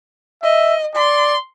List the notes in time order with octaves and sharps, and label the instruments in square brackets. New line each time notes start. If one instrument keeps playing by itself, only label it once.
[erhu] D#5 [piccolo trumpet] E5
[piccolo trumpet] D5 [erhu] C6